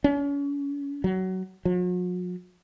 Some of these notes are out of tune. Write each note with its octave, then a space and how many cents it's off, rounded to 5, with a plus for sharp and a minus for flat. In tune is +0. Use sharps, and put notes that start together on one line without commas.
C#4 +35
F#3 +20
F#3 -45